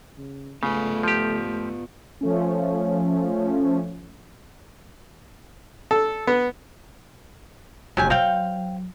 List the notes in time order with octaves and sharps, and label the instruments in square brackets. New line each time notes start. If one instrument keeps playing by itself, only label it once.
[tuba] C#3
[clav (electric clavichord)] C#3 [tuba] A3 [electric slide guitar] B3 F4 B4
[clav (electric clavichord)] F3 G4
[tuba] A3
[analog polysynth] F3 A3 C#4
[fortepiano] A4
B3
[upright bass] F1 D3 [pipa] F#3 G4 G#5
[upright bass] F#3 [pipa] C4 F5 G5